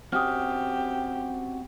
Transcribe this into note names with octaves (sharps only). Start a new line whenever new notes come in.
C4 C#4 F#4 G4 D#6 F6